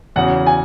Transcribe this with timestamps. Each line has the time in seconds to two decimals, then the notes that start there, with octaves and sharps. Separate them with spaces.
0.16 E2 C#3 F#3 F#5
0.47 G#5